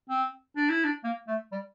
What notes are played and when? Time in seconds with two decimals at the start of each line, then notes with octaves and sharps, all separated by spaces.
0.09 C4
0.56 D4
0.70 E4
0.84 D4
1.04 A#3
1.28 A3
1.52 G3